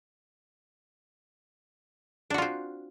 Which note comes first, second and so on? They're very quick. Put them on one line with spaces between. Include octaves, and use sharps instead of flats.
D4 F#4 F4 C4